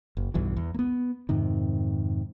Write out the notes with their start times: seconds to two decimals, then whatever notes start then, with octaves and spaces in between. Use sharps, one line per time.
0.17 F#1
0.34 B1 E2 G2 E3
0.56 E2
0.74 A#3 B3
1.29 F2 G#2 C3 D#3